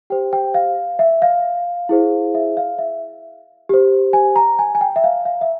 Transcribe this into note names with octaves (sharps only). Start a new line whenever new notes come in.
G4 C5 G5
G5
F5
E5
F5
E4 G#4 C5
E5
F5
E5
G4 C5
G#5
A#5
G#5
G#5
G5
E5
F5
F5
E5